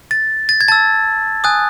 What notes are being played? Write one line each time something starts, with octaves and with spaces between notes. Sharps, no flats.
A6
A6
G#6
A5 E6 A6
G#5 D#6 F#6